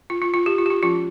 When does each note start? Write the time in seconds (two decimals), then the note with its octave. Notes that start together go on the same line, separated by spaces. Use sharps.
0.10 F4
0.22 F4
0.34 F4
0.46 G4
0.58 F4
0.66 G4
0.70 F4
0.82 F3 G#3 C#4 F4